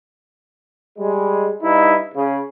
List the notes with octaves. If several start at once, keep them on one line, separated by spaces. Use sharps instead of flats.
G3 G#3
G2 D#4 E4
C#3